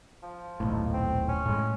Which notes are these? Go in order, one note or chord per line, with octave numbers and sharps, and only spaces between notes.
F3
D#1 B1 A2
C4
C#4
A2 G#3